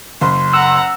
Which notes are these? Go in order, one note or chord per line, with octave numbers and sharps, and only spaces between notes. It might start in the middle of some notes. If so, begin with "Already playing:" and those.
F#1 C6
F#5 A#5 E6